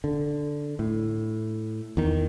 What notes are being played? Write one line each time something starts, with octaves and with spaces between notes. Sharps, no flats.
D3
A2
E2 D#3